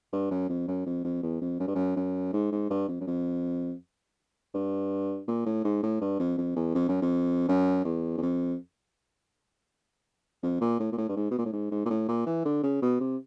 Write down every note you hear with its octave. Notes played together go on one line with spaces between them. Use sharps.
G2
F#2
F2
F#2
F2
F2
E2
F2
F#2
G2
F#2
F#2
G#2
G#2
G2
F2
F#2
F2
G2
A#2
A2
G#2
A2
G2
F2
F2
E2
F2
F#2
F2
F#2
E2
E2
F2
F2
A#2
A2
A#2
A2
G2
G#2
B2
A#2
A2
G#2
G#2
A#2
A2
A#2
E3
D3
C#3
B2
C3